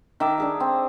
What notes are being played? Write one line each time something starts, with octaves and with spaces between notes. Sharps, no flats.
D#3 E5 A5 D6
D4 G#4 E5
C4